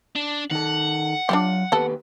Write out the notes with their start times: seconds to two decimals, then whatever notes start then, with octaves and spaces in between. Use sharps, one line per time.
0.16 D4
0.51 D#3 A4 F#5
1.29 F#3 D4 F4 G4 C6
1.72 D#2 B3 G4 A4 B4